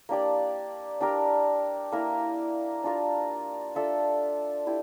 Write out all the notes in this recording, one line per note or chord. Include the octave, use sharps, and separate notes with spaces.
A#3 D4 G4 D5
D4 G4 A#4
A#3 E4 A#4
D4 F4 A#4
D4 F4 A4 E5
E4 G4